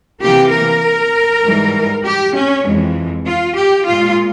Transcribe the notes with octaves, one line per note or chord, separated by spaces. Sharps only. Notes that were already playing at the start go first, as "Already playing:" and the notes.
C3 E3 A#3 G4
A#4
G#2 E3 G3
G4
C#4
F2 E3 G#3
F4
G4
A#2 G#3 F4